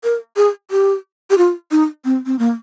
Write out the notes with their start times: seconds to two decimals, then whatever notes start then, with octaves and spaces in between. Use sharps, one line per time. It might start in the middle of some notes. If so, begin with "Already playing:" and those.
0.04 A#4
0.37 G#4
0.71 G4
1.30 G4
1.38 F4
1.71 D#4
2.05 C4
2.26 C4
2.39 A#3